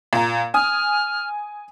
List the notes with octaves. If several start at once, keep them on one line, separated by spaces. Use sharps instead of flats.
A#2 A#5
G#5 D#6 F6